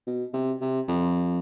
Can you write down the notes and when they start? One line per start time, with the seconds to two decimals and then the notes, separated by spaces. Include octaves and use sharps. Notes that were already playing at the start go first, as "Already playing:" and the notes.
0.07 B2
0.34 C3
0.61 C3
0.88 F2